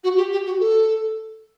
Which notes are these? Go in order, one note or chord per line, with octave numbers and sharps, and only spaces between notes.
F#4
G4
G4
F#4
A4